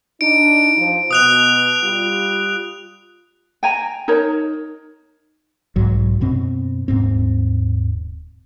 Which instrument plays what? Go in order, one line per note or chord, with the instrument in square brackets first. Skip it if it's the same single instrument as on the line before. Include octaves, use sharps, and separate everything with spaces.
[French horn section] D4 D#4 [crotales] D7
[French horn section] F3
[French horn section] B2 [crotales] D#6 F#6 F7
[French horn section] G3 F4
[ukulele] G5 G#5 A#5
D#4 A#4 C#5 A#5
[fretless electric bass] B1 G#2 F#3
F#2 B2 C4
D#1 G#2 C4